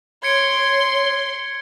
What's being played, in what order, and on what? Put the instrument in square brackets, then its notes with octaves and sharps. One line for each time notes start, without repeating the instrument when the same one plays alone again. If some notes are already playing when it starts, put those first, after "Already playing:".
[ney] C#5 [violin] C6 [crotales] G#6 C#7 D7